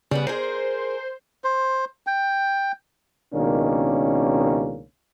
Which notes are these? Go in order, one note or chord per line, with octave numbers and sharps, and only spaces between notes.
C#3 G3 B3 B4
G#4 A#4 C5
C5
G5
C#2 B2 D#3 A#3 C#4 D4